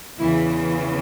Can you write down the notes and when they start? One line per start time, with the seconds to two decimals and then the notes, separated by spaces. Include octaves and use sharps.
0.19 E2 C#3 E3 E4